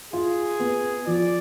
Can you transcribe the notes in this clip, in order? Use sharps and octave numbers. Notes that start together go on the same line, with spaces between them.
F4 G#4
B3
F3 D5